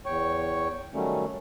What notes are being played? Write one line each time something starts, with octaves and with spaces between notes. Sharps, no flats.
E2 C#5 G5 C#6
D#3 F#3 G3 A3 C#4